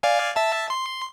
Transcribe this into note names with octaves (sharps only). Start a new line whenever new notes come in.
D5 F5 G#5
E5 A5
C6